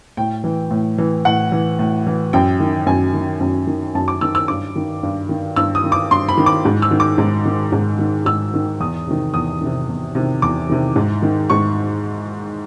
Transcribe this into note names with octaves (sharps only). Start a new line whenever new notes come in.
A2 G5
E3
A2
E3
A2 F#5
E3
A2
E3
F#2 G5
D#3
F#2 G#5
D#3
F#2
D#3
F#2 A5
D6
D#3 E6
E6
G2 D6
D#3
G2
D#3
G2 E6
D#6
D#3
D6
G2 C6
B5
D#3
D6
G#2
E6
D#3
D6
G#2
D#3
G#2
D#3
G#2 E6
D#3
E2 D#6
C3 D#3
E2 D#6
C3 D#3
E2
C3 D#3
E2 D6
C3 D#3
G#2
D#3
G#2 C#6